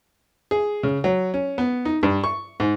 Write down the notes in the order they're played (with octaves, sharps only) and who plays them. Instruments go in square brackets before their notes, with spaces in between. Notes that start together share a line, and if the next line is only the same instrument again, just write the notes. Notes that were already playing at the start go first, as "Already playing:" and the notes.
[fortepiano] G#4
C#3
F#3
C#4
B3
D#4
G2
C#6
G#2